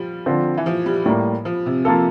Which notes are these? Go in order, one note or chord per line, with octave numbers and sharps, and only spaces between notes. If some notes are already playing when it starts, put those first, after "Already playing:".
Already playing: F3 G3
D3 F3 C4 F4
E3
F3
G3
A2 G3 A#3
F3
C3
F3 A#3 F4 A4